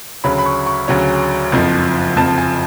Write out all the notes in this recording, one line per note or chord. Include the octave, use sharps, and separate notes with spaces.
D2 C#3 F#3 C#4 B5
B5
C#6
C#6
D2 C#3 F#3 C#4
F#1 F2 F3
F#1 F2 F3 A5
G#5